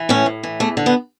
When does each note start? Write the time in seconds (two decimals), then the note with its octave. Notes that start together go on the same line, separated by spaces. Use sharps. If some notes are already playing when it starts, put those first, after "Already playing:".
Already playing: E3
0.09 A2 C#4
0.26 A2
0.43 E3
0.60 E2 A3
0.77 D3
0.86 B3